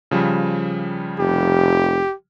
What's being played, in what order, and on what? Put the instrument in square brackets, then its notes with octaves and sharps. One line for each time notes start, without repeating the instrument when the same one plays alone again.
[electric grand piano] C#3 F3 G3
[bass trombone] F1 [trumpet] G4